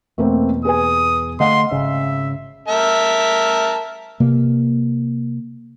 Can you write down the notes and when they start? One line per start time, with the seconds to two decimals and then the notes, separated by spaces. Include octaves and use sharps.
0.18 E2 B2 A3 A#3 C4
0.65 G#4 B4 G#5 D#6
1.40 D3 A3 D#5 F5 F#5 C6
1.71 G#1 C#3 C#4 E5
2.68 A#4 E5 A5
4.20 C3 A#3